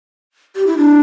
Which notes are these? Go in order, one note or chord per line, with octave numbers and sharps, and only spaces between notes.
G4
E4
D4